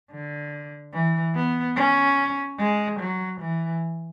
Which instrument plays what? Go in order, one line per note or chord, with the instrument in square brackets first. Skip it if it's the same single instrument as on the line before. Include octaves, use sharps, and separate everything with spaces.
[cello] D3
E3
B3
C#4
G#3
F#3
E3